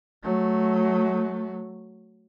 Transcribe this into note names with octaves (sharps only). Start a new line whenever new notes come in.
F#3 A3